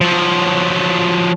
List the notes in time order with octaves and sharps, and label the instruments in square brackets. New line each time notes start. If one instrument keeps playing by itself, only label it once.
[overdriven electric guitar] F3 F#3